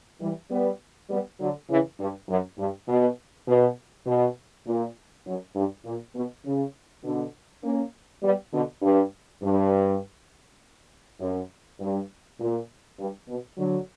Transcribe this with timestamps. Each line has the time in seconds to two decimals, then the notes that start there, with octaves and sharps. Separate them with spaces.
0.21 E3 G3
0.50 G3 B3
1.10 G3 B3
1.40 D3 F#3
1.69 C#3 E3
1.99 G2
2.29 F#2
2.59 G2
2.89 B2
3.47 B2
4.07 B2
4.66 A#2
5.27 F#2
5.56 G2
5.86 A#2
6.15 B2
6.46 C#3
7.04 B2 D3
7.64 A#3 C#4
8.23 G3 B3
8.53 B2 D3
8.82 G2
9.42 G2
11.21 F#2
11.80 G2
12.40 A#2
12.99 G2
13.28 B2
13.58 D3 F#3